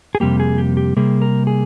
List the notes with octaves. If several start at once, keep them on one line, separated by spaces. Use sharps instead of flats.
G#4
F2 C3 G3 A#3 G4
G#4
G4
G4
C3 G3 A#3 G#4
A#4
G#4